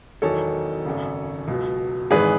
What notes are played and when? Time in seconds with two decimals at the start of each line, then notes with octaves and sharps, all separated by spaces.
0.22 E1 E2 D#3 F#3 A4 C#5
0.85 G#1 F#2 C#3
1.48 C#2 B2 F#3
2.11 G#1 G#2 E3 G#4 B4